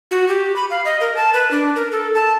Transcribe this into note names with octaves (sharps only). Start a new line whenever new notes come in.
F#4
G4
B5
F5
D#5
A#4
A5
B4
D4
A#4
A4
A5